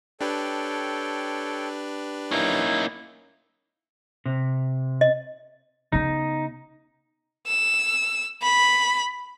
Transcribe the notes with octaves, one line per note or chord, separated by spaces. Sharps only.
D4 G4 A4 B4 C#5 G5
A#3 C#4 D#4 E4 G6
C3
D#5
C#3 B3 D#4
E6
B5